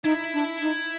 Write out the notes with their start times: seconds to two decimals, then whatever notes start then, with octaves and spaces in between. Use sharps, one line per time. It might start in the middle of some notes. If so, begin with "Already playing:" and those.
0.04 D#4 E4
0.34 D4
0.63 D#4